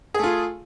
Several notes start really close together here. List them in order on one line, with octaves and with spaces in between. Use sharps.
G#4 A3 F4